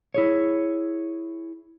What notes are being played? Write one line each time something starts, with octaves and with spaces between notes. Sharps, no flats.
E4 G#4 C#5